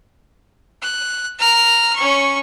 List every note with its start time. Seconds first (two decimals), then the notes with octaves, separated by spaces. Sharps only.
0.82 F#6
1.39 A#5 F6
1.96 C#4 C#6